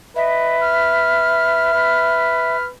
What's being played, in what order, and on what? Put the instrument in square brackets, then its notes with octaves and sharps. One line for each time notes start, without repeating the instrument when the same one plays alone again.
[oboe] B4 [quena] D#5 [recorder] E5
[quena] F6
[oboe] B4